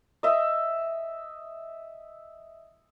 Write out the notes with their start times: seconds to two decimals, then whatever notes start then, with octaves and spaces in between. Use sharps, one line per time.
0.23 D#5 E5